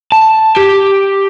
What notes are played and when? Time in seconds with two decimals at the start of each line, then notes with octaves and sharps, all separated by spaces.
0.12 A5
0.57 G4